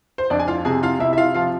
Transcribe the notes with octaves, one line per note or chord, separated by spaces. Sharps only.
C5
F2 D4 D5
G#5
F4 F5
C3 G#4 G#5
F4 F5
C3 E4 E5
E5
F4 F5
F3 F4 F5